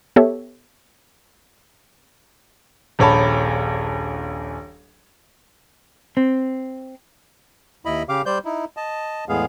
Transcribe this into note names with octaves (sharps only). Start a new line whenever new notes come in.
B3 G4 A4 C#5 E5
D#1 A#1 C#5 A5 B5
C4
D#2 E4 D#5 B5
C#3 G4 F5 D6
G3 C5 D5 G6
D#4 E4
D#5 A5
E2 A2 G#3 B3 G#4 F5